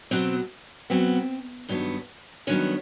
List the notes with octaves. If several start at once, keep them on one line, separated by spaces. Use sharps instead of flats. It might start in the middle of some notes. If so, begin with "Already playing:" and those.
B2 F#3 B3 C4
B2 F#3 B3 C4
G2 D#3 F#3 B3
G2 D#3 F#3 B3 C#4